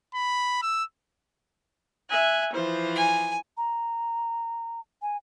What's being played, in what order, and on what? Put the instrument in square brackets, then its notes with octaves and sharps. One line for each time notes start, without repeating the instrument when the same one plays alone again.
[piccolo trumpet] B5
E6
[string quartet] E5 G#5 F#6
E3 F3 C5
[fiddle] G#5
[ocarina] A#5
G#5